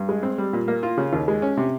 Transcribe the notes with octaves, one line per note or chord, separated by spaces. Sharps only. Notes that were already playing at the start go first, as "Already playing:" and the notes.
Already playing: G2
G#3
C4
G3
A#2
A#3
F4
C#3
D#2
G#3
C#4
C3